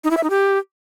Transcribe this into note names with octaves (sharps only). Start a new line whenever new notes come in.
D#4
E4
E5
D#4
G4